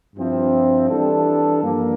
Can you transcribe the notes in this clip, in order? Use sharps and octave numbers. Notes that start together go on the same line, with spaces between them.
G2 F3 C4 E4
E3 G3 D4 A4
G2 F3 A#3